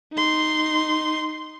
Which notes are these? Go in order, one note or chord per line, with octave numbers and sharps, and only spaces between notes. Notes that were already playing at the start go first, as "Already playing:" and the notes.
D#4 C6